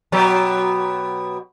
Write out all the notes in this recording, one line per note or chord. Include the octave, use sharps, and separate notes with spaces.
B2 F#3 G4